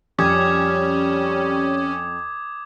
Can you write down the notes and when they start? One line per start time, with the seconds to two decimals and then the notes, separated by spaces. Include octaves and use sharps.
0.19 F2 G3 C#4 D6 D#6 G#6